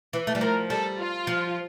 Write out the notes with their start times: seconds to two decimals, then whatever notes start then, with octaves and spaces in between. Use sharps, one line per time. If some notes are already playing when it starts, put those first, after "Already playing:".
0.13 E3
0.27 A3
0.35 G3
0.41 F3 A#4
0.70 G3 A4
0.99 F4
1.27 F3